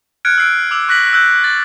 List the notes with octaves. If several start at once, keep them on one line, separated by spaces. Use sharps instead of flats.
F6 F#6 G#6 C#7 D7
E6 C7 D7
D6 E6 F7
C#6 F#6 A#6 B6 F#7
E6 F#6 G6
A6